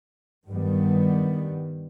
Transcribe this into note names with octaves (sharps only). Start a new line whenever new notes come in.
G2 D#3 G3 B3